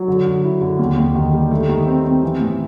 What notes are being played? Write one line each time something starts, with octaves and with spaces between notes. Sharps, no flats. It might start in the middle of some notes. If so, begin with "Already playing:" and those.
Already playing: F#3
D3
D3
E4
D3
D#2
D#2
D#3
G3
A3
D#3
C4
C4
E3
A2